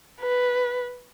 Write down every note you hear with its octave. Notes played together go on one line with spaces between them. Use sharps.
B4